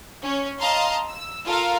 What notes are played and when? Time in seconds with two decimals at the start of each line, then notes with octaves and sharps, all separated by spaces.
0.23 C#4
0.60 D#5 F5 A5 A#5 C6
1.09 E6
1.45 F4 A4 A#4 F5